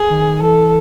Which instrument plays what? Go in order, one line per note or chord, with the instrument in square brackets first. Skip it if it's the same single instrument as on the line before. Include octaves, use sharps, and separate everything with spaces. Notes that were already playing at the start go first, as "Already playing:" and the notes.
Already playing: [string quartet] G#4
[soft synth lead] D#3
[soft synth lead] E3 [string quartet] A4